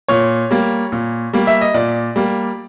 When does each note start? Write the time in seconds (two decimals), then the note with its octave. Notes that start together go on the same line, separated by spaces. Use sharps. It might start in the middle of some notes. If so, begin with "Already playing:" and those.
0.08 A#2 C#5
0.51 G3 A#3
0.92 A#2
1.33 G3 A#3
1.47 E5
1.61 D#5
1.74 A#2 D5
2.16 G3 A#3